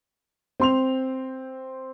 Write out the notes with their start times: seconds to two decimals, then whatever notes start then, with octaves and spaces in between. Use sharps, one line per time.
0.60 C4 C6 F7